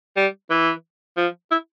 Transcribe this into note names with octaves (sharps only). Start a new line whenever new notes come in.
G3
E3
F3
E4